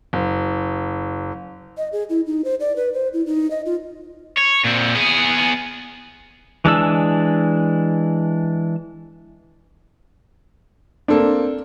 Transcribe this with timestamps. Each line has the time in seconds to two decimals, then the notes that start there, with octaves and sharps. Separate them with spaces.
0.13 F#1
1.77 D#5
1.93 G#4
2.10 E4
2.26 D#4
2.45 C5
2.60 D5
2.76 B4
2.93 C5
3.13 E4
3.26 D#4
3.51 D#5
3.66 F4
4.37 C#5
4.64 A#2 C4
4.95 B3 G#4
6.64 E3 G#3 D4 E6
11.08 A#3 C4 D4 A4